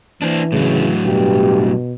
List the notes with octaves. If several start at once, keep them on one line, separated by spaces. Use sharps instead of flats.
E3 D4 C5
A2 C#3 F#3
G2 B2 G4